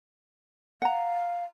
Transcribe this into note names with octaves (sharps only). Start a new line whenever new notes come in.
F5 F#5 A#5